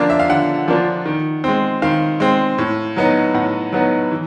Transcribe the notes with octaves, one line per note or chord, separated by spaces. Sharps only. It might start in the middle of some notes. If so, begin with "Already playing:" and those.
Already playing: D3 F3 A#3 D4 F4
E5
F5
D3 F#5
F3 A#3 D4 F4
D#3
G#3 C4
D#3 F5
G#3 C4
A2
F#3 B3 D#4
A2 F#5
F#3 B3 D#4
E3